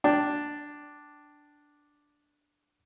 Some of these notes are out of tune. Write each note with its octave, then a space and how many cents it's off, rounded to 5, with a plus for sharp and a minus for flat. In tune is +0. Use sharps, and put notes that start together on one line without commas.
D4 +0 G5 -15